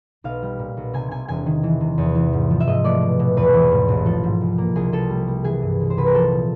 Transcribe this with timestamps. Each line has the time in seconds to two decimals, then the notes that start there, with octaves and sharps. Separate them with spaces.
0.24 B1 F5
0.43 G3
0.59 A#2
0.77 B1
0.93 C3 G#5
1.11 C3 G#5
1.28 E1 G#5
1.46 D#3
1.63 E3
1.81 C3
1.98 E2
2.15 E3
2.33 G#2
2.50 F3
2.60 E5
2.67 G#2 D#5
2.84 A3 D5
3.01 B2
3.19 B2
3.37 E2 B4
3.53 E2
3.71 G#2
3.88 A1
4.06 F3 A4
4.23 G#2
4.41 C2
4.58 A#3
4.76 C2 G#4
4.92 C2 A4
5.10 G3
5.27 G3
5.44 E3 G#4
5.62 G2
5.80 C2
5.90 C5
5.97 C2 B4
6.06 A#4
6.14 F3 A4
6.32 A#2